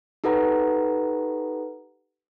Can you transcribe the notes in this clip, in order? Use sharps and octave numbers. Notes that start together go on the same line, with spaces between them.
D#4 G4 A4 B4 F#5 A#5